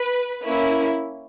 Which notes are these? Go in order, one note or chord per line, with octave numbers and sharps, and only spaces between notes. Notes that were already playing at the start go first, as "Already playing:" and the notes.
Already playing: B4
A#3 C#4 E4